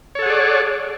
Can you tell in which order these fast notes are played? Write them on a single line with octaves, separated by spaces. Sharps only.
C#5 A4 F#5 G#4 D5